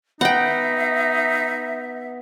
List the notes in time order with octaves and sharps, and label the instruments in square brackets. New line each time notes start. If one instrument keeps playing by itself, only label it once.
[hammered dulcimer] B3 [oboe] D#4 [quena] E5 [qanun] F#5 G5